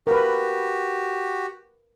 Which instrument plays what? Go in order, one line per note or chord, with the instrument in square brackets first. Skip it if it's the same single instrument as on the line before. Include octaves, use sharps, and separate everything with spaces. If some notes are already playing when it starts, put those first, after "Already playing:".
[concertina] F#4 G4 [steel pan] A#4 B4